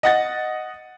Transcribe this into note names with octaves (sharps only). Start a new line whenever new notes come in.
D#5 F#5 A6